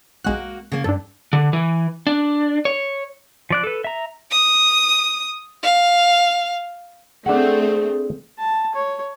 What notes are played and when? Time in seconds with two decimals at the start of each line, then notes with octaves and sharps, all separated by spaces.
0.24 B1 G#3 A#3 F#4 F#6
0.72 C#3 A#3
0.84 G2 D4 A4
1.33 D3
1.53 E3
2.07 D4
2.65 C#5
3.50 F3 D5 F#6
3.64 A4 B4
3.84 E5 A#5
4.31 D#6
5.63 F5
7.26 A3 C4 D4 G#4 F#5
8.38 A5
8.75 C#5